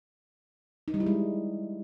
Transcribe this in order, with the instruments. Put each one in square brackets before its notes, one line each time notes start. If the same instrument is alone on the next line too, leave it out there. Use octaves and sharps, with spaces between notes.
[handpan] D#4
G3
E4
G#3